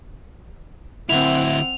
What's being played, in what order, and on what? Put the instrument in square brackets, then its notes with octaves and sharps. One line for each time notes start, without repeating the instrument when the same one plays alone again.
[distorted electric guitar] D2 E4 [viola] C4 F#5 [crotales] F7